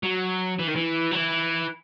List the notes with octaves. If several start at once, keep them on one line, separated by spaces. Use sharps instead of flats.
F#3
E3
D#3
E3
F#3
E3